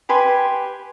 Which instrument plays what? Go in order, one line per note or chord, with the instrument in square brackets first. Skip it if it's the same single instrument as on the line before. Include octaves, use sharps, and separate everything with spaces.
[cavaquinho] G4 B4 G#5 C6